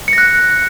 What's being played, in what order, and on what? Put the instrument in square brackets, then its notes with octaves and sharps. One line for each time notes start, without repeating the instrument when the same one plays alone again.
[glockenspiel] C#7
A#6
F#6